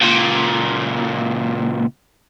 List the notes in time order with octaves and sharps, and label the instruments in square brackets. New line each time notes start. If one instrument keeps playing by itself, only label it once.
[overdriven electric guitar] C#2 A#2